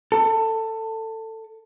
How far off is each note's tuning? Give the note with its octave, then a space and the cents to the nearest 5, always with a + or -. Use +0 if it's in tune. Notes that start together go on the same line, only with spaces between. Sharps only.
A4 +20